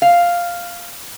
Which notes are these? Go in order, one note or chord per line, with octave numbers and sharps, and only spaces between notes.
F5